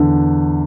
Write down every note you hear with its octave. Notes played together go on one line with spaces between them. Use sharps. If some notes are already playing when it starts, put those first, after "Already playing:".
Already playing: E2 D3